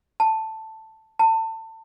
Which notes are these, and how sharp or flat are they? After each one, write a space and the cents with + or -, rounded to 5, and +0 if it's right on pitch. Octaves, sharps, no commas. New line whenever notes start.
A5 +5
A5 +30